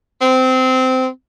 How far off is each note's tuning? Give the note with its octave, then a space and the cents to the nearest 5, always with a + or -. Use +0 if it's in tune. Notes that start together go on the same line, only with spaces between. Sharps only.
C4 -20